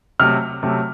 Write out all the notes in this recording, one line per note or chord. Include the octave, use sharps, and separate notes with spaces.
C3 F#3 A3 F6
C3 F#3 A3